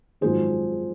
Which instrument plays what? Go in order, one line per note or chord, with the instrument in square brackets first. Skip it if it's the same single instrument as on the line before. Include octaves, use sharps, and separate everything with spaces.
[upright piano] G#1 F#2 F3 G#3 [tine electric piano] G#4 C5